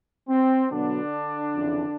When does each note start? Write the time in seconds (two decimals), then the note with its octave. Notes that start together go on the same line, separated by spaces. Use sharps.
0.29 C4
0.71 B2 D3 F#3 B3 D4
1.55 F2 C#3 E3